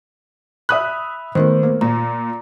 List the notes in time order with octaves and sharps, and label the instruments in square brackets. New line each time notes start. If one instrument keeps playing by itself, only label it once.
[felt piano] E5 D#6 F#6 [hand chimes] B5
[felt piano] D#3 [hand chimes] A3 B3 C5
[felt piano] A#3
[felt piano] A#2 [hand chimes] A#5